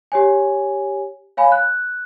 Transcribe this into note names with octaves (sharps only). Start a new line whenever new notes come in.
G4 C#5 G#5
C#5 F5 G#5 B5
F#6